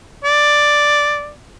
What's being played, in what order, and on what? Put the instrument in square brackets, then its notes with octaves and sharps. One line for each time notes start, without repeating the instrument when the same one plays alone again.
[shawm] D5